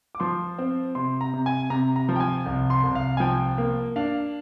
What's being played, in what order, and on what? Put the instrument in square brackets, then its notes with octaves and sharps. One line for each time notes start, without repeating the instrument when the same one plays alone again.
[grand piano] D6
F3 C6
C4
C3 C6
A#5
C3
G#5
C3 A#5
A#5
F3
G5
G#5
C2
C6
C2
F5
G#5
F3 G5
A#3
D4 F5